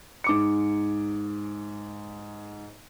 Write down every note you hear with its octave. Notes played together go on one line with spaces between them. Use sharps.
G#2 D6 C#7